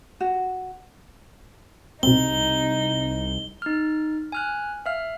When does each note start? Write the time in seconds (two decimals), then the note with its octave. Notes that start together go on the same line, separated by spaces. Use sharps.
0.20 F#4
2.03 C2 B2 C4 D#4 G7
3.62 D#4 F6
4.32 G#5 F6 F#6
4.86 E5 F5 F6